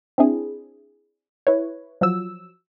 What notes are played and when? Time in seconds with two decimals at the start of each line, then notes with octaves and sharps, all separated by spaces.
0.18 C4 D4 E4 G#4
1.47 E4 B4 C#5
2.01 F3 F#3 E6